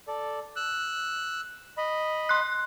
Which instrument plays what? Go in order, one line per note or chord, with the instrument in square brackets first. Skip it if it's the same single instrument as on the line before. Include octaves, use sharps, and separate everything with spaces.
[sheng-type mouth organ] A4 D5
E6 F#6
D#5 B5
[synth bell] C6 F#6